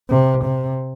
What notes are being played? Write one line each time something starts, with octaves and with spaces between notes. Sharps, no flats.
C3
C3